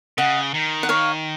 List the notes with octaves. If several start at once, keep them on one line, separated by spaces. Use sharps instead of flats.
C#3 D#5 F#5
D#3
F#5
C#5 F5